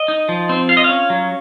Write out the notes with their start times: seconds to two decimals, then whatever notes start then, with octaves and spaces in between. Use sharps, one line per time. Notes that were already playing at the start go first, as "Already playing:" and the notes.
Already playing: D#5
0.08 D#4
0.29 F3
0.49 C4
0.69 F4 F5
0.77 D#5
0.84 C#4 F5
1.10 F#3